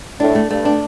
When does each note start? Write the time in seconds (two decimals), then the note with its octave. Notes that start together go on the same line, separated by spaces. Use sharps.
0.20 A2 D4
0.35 A3
0.50 G2 A3
0.65 D4